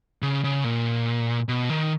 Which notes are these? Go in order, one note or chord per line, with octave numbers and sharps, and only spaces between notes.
C#3
C#3
A#2
B2
D#3